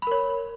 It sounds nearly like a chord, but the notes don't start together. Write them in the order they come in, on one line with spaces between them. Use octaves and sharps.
B5 A#4 C#5